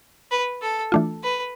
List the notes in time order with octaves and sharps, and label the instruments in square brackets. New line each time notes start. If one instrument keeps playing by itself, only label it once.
[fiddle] B4
A4
[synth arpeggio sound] E3 A3 D4 F4
[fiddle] B4